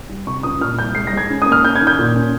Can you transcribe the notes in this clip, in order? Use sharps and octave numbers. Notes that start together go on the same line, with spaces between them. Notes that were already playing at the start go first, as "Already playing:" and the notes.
G3
C3 C#6
C#2 D#6
A#2 F6
C2 G6
G#3 C7
A#6
G#3 G#6
C#4
D#6
A#3
F6
C#4 G6
G#6
D#3
G6
A#2
C#4